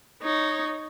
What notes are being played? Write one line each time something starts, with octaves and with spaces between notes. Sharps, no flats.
D#4 C#5